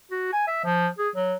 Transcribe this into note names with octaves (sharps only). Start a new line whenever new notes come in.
F#4
G#5
E5
F3
G#4
F#3